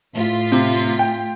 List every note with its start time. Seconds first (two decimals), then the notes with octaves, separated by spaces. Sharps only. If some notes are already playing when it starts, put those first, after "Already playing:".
0.14 A2 F4 B6
0.52 C3
0.99 G5